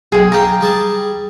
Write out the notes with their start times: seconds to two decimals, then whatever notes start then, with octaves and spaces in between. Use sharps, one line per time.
0.12 B1 G#4 G5
0.32 D4 F5 G5 A#5
0.61 G3 G#4 A5